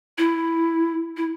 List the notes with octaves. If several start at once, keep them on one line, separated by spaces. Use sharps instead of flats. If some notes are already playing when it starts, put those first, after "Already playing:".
E4
E4